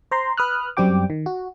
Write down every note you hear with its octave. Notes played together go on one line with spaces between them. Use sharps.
C5 A#5 C6
B4 D#6 F6 F#6
F#2 G3 C4 G4 G5 D6
D#3
F#4